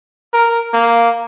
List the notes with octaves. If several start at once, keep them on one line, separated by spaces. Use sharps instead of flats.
A#4
A#3